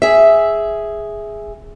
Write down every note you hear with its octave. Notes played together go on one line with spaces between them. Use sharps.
G#4 E5